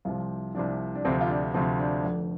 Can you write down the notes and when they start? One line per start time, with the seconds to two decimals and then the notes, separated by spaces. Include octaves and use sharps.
0.05 C2 C3 F3 F4
0.55 C2 C3 F3 D4
0.95 D4
1.05 D2 C3 F3 C4
1.21 F4
1.30 D4
1.54 D2 C3 F3 C4
1.79 D4
2.04 F1 F2 D3